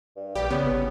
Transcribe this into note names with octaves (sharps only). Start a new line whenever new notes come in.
G2
A#1 G3 G4
C#3 B3 C#4
G1